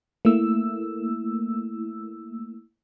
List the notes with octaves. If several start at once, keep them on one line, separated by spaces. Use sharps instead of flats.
A3 A#3 E4 E6